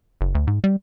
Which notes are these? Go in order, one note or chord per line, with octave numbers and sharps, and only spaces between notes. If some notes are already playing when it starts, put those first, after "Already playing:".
F#1
D2
G#2
G3